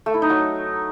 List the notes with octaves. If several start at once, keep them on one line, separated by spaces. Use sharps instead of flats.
A3
E4
D#4
F#3